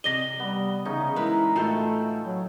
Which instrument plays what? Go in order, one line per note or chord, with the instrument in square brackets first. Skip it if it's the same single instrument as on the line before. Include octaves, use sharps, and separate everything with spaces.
[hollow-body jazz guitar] C3 D5 D#5 [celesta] A#6 G7
[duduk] G3 [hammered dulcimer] B3
[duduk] C#3 [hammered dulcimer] E3 C#4 D#4
[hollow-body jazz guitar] G#3 B4 [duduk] E4 [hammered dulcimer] A#4
[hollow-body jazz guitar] A2 F4 F#4 [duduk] A3 [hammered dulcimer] A4 G5
[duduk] F#3